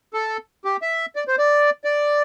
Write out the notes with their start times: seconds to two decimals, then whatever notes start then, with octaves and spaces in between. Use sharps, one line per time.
0.14 A4
0.65 G4
0.82 E5
1.16 D5
1.28 C5
1.38 D5
1.84 D5